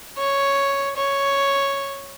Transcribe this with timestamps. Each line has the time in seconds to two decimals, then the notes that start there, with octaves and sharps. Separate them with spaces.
0.18 C#5
0.97 C#5